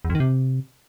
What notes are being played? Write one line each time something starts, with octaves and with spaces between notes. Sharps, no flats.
E2
F2
D#3
C3